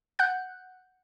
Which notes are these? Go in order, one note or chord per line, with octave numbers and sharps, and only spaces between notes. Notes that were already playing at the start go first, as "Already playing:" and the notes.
F#5 F#6 G6